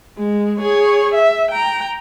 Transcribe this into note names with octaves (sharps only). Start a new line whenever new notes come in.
G#3
G#4 C#5
E5
G5 A#5